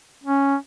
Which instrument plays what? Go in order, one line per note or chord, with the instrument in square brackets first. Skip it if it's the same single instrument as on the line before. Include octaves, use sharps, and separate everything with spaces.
[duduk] C#4